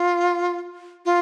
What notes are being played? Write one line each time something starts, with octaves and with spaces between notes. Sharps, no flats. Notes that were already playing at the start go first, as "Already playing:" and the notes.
Already playing: F4
F4